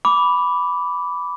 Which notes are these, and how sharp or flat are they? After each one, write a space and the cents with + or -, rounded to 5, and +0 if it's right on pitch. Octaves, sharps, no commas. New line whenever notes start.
B5 +0 D6 -15